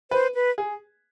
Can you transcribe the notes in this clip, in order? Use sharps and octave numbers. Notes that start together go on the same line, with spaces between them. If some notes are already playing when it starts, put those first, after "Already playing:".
B4 C5
B4
G#4